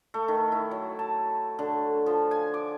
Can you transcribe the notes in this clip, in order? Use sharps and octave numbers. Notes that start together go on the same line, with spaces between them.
A3
D#3
E4
F#3
A5
D3
F3
G#5
D6